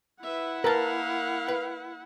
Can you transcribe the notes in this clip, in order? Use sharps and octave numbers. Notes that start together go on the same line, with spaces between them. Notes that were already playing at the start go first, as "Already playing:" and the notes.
E4 B4 E5 F#5
A#3 A#4 B4 F5 A5
B4